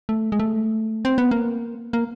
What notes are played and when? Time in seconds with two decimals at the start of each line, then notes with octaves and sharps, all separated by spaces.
0.09 A3
0.32 G#3
0.40 A3
1.05 C4
1.18 B3
1.31 A#3
1.93 A#3